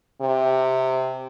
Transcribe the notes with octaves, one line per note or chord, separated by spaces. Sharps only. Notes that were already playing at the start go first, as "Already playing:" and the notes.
C3